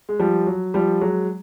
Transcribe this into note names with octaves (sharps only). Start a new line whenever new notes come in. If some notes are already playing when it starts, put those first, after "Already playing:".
G#3
F3 G3
F#3
F3 G3
F#3 G#3